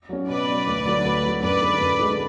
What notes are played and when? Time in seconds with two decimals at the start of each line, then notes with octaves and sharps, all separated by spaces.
0.09 F#3 C#4
0.28 B2 B4 D5
0.48 F#3 C#4
0.67 D2
0.86 D3 F#3
1.05 D2
1.23 D3 F#3
1.42 F#2 B4 D5
1.61 D3 G#3
1.80 F#2
1.99 D3 G#3